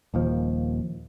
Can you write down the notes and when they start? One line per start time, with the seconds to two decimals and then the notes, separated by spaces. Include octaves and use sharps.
0.14 D#1 D#2 F3